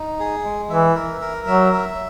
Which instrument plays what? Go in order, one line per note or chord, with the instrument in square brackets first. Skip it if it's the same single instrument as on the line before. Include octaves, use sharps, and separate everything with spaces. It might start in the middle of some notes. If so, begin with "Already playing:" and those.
Already playing: [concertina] D#4
G#4
G#3
[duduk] E3 [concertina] E5
[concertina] A#4
A#4
[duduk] F#3 [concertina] E5
[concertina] E5